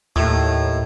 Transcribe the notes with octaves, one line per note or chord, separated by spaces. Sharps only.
D#2 A2